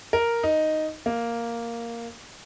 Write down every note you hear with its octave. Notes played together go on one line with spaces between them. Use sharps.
A#4
D#4
A#3